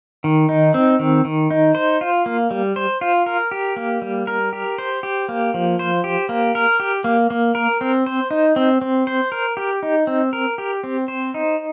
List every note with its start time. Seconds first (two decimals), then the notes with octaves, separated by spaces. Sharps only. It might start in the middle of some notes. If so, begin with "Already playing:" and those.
0.24 D#3
0.49 D#4
0.74 C4
0.99 D#3
1.25 D#3
1.51 D#4
1.75 C5
2.01 F4
2.26 A#3
2.51 G3
2.76 C5
3.01 F4
3.26 A#4
3.51 G4
3.76 A#3
4.02 G3
4.27 A#4
4.53 G4
4.78 C5
5.03 G4
5.29 A#3
5.54 F3
5.79 C5
6.04 G4
6.29 A#3
6.55 A#4
6.80 G4
7.04 A#3
7.30 A#3
7.55 A#4
7.81 C4
8.06 C5
8.31 D#4
8.56 C4
8.81 C4
9.07 C5
9.32 A#4
9.57 G4
9.83 D#4
10.07 C4
10.33 A#4
10.58 G4
10.84 C4
11.08 C5
11.34 D#4